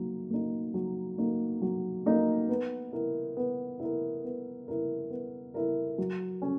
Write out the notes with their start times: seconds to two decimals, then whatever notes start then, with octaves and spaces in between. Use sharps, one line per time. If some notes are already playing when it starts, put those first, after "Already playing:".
Already playing: F#3 A#3 D#4
0.31 A#3 D#4
0.74 F#3
1.18 A#3 D#4
1.62 F#3
2.06 A#3 D#4
2.49 B3
2.93 E4 A#4
3.37 B3
3.80 E4 A#4
4.24 B3
4.68 E4 A#4
5.10 B3
5.54 E4 A#4
5.98 F#3
6.42 C#4